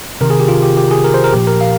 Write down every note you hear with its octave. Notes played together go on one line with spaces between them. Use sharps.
C3 D#3 A#4
G#4
G4
F4
G4
G4
G#4
A#4
C5
A#4
A#2 F3 G4
A#4
F5